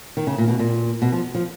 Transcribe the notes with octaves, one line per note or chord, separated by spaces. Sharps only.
D#3
C#3
A#2
B2
A#2
B2
F3
F3